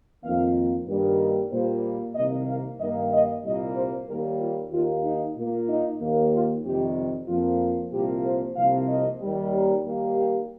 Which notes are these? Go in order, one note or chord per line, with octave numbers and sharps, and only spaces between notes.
F2 D#3 A#3 F5
G2 D#3 G3 A#3
A#2 G3 A#3 C5
C2 C3 D#3 A#3 D#5
F5
G2 D#3 A#3 D#5
D#5
C2 A#2 G3 A#3 D#5
C5
D#2 D#3 G3 A#3 A#4
F4
D#2 D#3 A#3 F4
D#4
A#2 A#3
D#4
D#2 D#3 A#3
F4
F2 C3 D#3 G3 G4
F2 F3 A#3 F4
C2 A#2 F3 A#3 G4
C5
C2 C3 F3 A#3 F5
D#5
D#2 D#3 G3
A#4
D#2 D#3 G3 A#3
G4